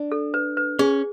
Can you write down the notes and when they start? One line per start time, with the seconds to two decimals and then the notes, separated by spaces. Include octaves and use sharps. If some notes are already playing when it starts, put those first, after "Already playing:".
Already playing: D4
0.12 A4
0.34 B4
0.57 B4
0.79 C#4 G#4